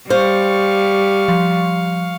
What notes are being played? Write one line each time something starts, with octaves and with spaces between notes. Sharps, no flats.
G3 C5 F5 C#6
F3